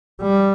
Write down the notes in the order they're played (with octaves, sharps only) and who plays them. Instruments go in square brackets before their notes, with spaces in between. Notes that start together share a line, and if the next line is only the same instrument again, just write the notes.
[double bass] G3